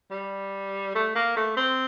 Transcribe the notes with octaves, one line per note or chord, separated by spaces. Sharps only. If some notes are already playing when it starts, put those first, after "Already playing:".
G3
A3
A#3
A3
C4